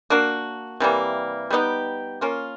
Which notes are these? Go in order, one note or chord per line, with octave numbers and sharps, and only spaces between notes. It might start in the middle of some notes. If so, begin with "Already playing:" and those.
A#3 D4 F#4
C3 E3 G3 A#3
G3 B3 D#4 G4
A#3 C#4 F4